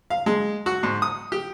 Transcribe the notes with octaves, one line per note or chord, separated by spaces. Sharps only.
F5
G#3
F#4
G#2
D#6
G4